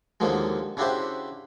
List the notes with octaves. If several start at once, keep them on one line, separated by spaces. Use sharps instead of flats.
D#2 D3 F3 F#3 G#3
C#3 D4 E4 F#4 G4 C5